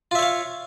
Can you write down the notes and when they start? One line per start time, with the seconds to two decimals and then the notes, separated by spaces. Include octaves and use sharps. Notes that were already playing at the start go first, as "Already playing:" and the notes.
0.11 F4
0.15 E5
0.19 C#5
0.22 F5